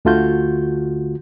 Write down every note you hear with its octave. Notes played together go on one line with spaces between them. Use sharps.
D2 D3 A3 F4 F#4 G6